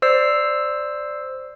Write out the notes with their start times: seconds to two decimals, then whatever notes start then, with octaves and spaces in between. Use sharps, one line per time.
0.02 C5 D5 E6 C7